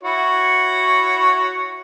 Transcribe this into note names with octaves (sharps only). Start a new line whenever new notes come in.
E4 F#4 C#5